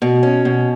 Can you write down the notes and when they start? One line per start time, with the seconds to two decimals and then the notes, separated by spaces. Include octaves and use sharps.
0.02 B2
0.23 C#4
0.45 B2